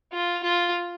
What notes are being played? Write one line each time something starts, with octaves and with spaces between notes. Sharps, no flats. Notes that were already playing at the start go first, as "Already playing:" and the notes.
F4
F4